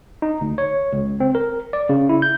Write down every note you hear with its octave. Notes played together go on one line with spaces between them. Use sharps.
D#4
D2
C#5
C#2
C4
A#4
D5
C#3
E4
G6